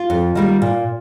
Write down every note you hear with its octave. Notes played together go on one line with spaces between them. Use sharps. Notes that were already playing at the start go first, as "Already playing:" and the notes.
Already playing: F4
F2
D#3 G3 A#3
A#2